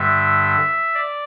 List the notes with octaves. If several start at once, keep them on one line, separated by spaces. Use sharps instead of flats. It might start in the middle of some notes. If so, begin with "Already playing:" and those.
Already playing: G2 D3 G3 E5
D5